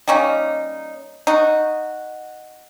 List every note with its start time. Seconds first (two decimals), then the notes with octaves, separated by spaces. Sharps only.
0.08 G3 A#3 C#4 D#4
1.27 D#4 F#4